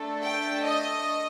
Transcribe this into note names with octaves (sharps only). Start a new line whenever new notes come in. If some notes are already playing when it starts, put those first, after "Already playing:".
Already playing: A3 D4 A4
G5
D#5